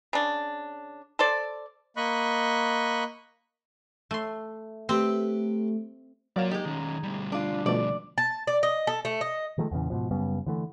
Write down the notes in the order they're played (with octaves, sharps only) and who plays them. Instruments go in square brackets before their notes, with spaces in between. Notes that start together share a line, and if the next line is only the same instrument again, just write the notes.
[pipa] C#3 D4
A4 C5 D5
[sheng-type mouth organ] A#3 D#5 B5 C#6 F#6
[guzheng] A3 C6
[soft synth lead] A3 [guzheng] C4 [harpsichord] G4 B4
[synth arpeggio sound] F#3 A#3 A6 [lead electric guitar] A#4 D5
[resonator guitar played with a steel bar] G#3 D#4 [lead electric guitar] G4
[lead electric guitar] D#3 C#4
D2 G3
[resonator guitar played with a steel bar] D4 F4
[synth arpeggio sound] B2 F3 A3 [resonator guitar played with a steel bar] D5
[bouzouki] A5
D5
D#5
A4
A3
D#5
[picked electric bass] D#3 F3 G#3 A3
E2 A#2 C#3 E3
G#2 B2 F3
F#2 C#3 G3 B3
D3 E3 A3